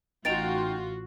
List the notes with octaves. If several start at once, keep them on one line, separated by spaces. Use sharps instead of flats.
A1 D#4 F4 F#4 G5 A6 D7 F7